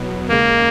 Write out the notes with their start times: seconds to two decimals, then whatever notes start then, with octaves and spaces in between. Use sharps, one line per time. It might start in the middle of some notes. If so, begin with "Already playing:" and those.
Already playing: E2 B2 F#3 B3
0.28 D#2 C#3 G#3 A#3